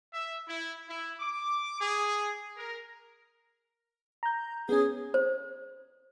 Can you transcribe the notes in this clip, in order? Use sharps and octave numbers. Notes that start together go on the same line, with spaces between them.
E5
E4
E4
D6
G#4
A#4
A#5 G6
B3 C#4 G#4
C5